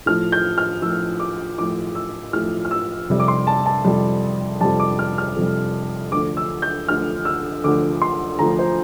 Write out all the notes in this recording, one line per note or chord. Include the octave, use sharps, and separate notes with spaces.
A2 F3 F6
G6
F6
A2 F3 E6
D6
A2 F3 D6
E6
A2 F3 F6
F6
E6
F2 C3 G3
D6
C6
A5
A5
F2 C3 G3
F2 C3 G3 A5
D6
F6
F6
F2 C3 G3
D2 D3 F3 D6
E6
G6
D2 D3 F3 F6
E6
D2 D3 F3 D6
C6
D2 D3 F3 A#5
C5